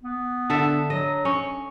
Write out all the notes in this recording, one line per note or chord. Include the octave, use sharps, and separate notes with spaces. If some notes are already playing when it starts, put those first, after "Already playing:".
B3
D3 A4 E5
F#3 D#5
C#4 C#6